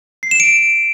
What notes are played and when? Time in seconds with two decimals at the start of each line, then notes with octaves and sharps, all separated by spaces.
0.23 C7
0.31 E7
0.40 D7